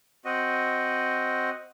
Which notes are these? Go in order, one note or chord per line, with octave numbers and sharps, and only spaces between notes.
C4 F#4 D#5